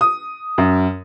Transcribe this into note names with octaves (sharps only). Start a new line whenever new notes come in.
D#6
F#2